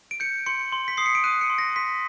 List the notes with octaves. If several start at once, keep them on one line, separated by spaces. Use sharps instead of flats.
D7
G6 C#7
C6 C#7
C6
B6
D#6 C7
C#7
D7
F#6 D#7
C#7
C6
A#6
C6 B6